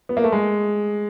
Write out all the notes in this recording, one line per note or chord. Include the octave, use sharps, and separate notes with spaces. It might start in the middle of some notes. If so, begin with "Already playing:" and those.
B3
A#3
A3
G#3